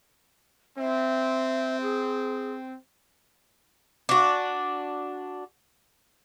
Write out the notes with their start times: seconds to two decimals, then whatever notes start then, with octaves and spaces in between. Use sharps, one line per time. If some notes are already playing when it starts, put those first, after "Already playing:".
0.78 C4 E5
1.82 G#4
4.09 D4 F#4